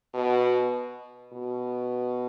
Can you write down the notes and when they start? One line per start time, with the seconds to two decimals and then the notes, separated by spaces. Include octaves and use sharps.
0.14 B2
1.33 B2